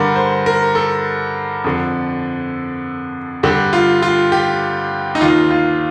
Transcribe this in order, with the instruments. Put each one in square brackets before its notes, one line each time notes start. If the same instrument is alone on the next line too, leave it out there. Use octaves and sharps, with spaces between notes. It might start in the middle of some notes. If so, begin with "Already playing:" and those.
Already playing: [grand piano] G2 D3 A#4
C5
A#4
A4
F2 D3
G2 D3 G4
F4
F4
G4
D#4
D#2 D#3 F4
F4